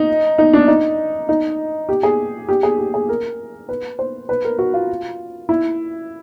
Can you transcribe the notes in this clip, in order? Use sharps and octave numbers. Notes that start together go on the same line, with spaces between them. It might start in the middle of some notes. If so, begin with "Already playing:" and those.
Already playing: D#4
D#4
D4
D#4
D#4
G4
G#4
G4
G#4
G4
G#4
A#4
B4
C5
B4
A#4
F#4
F4
E4